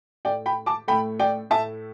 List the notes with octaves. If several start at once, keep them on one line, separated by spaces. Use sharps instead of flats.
A2 A3 D5 G5
G5 B5
A5 D6
A2 A3 G5 B5
D5 G5
A2 A3 E5 A5